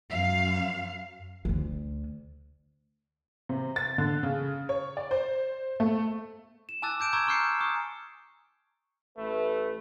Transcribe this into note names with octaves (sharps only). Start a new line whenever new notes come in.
F#2 F5
D2 D3
C3
A6
D3
C#3
C#5
D5
C5
A3
E7
G#5 A5 D6 E6 F#6 A6
D6 G6 D7 E7
G#5 A#5 C#6 D6 E6 G#6
C6 C#6 F6 G6 C7 C#7
C#6 D#6
A1 A3 B4